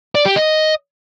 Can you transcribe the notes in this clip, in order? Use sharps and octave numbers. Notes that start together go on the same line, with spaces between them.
D5
G4
D#5